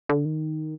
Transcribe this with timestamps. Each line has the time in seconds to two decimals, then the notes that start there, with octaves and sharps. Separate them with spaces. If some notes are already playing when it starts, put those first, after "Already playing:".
0.09 D3
0.25 D#3